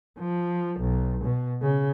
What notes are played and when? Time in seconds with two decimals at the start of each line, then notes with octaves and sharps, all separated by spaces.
0.18 F3
0.80 B1
1.25 B2
1.62 C#3